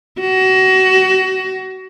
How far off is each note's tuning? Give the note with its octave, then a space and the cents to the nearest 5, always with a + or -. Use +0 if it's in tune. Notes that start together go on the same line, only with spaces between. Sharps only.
F#4 +30